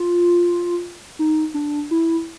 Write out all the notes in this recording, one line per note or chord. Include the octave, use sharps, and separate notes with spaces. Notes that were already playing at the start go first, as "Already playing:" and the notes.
Already playing: F4
D#4
D4
E4